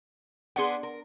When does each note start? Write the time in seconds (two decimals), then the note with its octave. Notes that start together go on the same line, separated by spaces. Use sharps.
0.56 B3 D4 G#4 F#5 C6
0.83 A#4